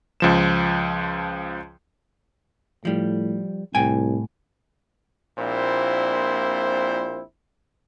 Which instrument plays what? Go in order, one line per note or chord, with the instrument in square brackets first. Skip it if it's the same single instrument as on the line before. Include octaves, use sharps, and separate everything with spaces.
[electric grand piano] C#2 F3 E7
[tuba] A2 [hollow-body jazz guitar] F3 G3
[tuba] C2 [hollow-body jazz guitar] A2 G5 G#5
[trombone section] A#1 A#2 C4 E4 C5